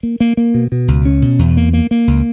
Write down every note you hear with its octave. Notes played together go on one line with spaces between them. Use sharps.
A#3
A#3
A#3
B2
B2
C#2
C#4
B2
E2
A#3
A#3
A#3
C#2